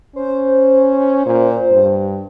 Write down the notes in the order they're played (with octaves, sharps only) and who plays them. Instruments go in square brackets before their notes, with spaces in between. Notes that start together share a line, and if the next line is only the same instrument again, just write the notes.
[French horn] C#4 [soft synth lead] C5
[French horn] A#2
G2